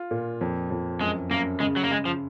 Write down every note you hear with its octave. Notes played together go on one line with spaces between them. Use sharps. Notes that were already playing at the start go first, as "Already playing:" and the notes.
Already playing: F4
A#2
F2
F2
F#2 G#3
F#2 A#3
C#3 G#3
F#3
A#3
C#3 G#3
F3